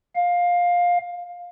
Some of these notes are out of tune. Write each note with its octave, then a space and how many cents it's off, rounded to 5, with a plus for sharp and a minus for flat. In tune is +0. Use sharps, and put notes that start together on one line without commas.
F5 +15